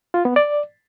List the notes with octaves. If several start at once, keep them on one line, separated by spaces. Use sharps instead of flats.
F4
B3
D5